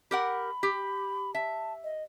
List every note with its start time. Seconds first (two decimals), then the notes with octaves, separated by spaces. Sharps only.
0.11 G4 A#4 F#5 B5
0.63 G4
1.35 E5 A5
1.84 D#5